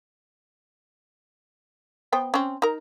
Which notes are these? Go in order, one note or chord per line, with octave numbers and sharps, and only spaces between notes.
B3 C5 G5
C4 C#4
D#4 A#4